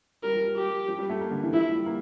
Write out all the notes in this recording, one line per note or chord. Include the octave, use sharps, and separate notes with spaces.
G3 A#4
F3
G3
G4
F3
G3
A3
A#3
D3
E3
F3 E4
G3
A#3